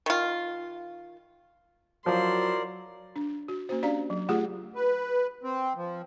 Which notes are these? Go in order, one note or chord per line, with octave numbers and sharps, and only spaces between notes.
D#3 F4
F3 F#3 E4 A#4 D5 C6
D4
F#4
A#3 C#4 F#4 C5
C#4 D4 G4 D5 F5 A#5
F#3
A3 F4 G4 G#4 F#5
B4
C4
F3